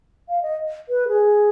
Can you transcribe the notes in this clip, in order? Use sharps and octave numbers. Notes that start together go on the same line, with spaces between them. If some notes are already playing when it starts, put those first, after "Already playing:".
F5
D#5
B4
G#4